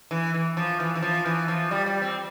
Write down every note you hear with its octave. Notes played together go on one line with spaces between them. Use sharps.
E3
E3
F3
E3
E3
F3
E3
F3
G3
G3
C4